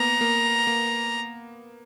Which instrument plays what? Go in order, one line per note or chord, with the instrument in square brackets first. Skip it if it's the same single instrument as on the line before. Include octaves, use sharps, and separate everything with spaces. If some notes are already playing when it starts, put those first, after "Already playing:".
Already playing: [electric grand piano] A#3 B3 [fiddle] A#5
[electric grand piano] A#3
A#3